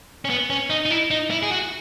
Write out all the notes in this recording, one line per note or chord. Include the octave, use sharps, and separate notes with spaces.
C#4
B3
C#4
D#4
D#4
E4
D#4
E4
G#4
F#4